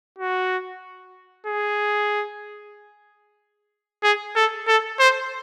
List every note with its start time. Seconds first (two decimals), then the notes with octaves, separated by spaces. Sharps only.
0.18 F#4
1.46 G#4
4.03 G#4
4.36 A4
4.67 A4
4.99 C5